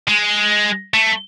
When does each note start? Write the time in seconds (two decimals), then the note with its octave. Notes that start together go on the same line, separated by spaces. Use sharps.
0.08 G#3
0.94 A3